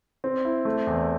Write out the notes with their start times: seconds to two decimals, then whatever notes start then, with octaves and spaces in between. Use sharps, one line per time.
0.24 C4
0.45 E4
0.65 A3
0.87 E2